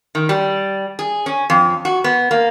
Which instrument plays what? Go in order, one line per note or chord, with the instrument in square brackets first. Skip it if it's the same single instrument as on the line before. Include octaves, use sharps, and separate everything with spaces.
[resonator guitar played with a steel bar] D#3
G3
G#4
C#4
F2
F#4
B3
A#3